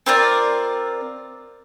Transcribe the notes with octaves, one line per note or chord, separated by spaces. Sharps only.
C4 F4 A#4 D5